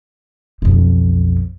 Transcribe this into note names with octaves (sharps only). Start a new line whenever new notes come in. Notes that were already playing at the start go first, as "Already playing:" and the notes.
B1 F2